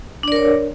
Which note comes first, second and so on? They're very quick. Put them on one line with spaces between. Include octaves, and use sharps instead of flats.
D4 D5 A#4 C#5